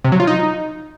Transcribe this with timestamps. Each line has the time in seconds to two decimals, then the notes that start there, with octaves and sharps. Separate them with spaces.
0.04 C3
0.12 F#3
0.20 F4
0.27 D#4